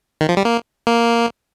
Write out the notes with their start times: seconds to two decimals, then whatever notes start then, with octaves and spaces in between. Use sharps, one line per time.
0.21 D#3
0.29 F3
0.37 G3
0.45 A#3
0.87 A#3